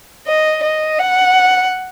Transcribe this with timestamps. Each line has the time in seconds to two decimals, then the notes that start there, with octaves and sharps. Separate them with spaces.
0.27 D#5
0.64 D#5
0.99 F#5